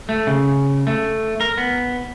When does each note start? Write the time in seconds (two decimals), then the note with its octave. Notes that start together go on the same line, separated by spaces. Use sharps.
0.09 A3
0.27 C#3
0.87 A3
1.41 A#4
1.58 B3